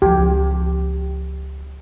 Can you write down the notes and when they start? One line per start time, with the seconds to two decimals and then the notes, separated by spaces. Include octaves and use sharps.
0.02 C#2 F3 G4